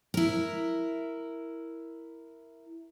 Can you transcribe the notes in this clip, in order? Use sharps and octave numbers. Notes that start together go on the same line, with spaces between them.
E4 A#4